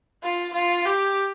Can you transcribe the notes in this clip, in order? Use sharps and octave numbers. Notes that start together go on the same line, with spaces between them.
F4
F4
G4